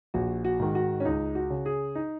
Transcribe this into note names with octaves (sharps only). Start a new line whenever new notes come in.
A#1 F#4
F#4
G#2 D#3
F#4
C#4
C#2 D#4
F#4
C#3
G#4
D#4